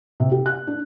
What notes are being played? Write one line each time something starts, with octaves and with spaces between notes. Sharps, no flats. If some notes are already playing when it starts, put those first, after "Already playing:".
C3
G4
F#6
D4